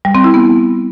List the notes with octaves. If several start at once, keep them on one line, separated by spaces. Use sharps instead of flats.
G3
C4
E4
B3